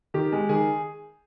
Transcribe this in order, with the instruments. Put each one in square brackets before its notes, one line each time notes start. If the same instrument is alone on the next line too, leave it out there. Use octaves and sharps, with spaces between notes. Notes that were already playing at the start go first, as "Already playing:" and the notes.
[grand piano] D#3 G4
G#3
D#3 G#4